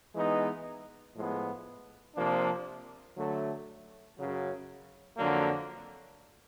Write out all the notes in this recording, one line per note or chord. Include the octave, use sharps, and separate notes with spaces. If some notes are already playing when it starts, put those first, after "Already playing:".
E3 G#3 B3 D#4
A2 F3 G#3 B3
C3 F3 A#3 D4
D3 F#3 A3
F#2 C#3 F#3
F2 D3 F#3 A#3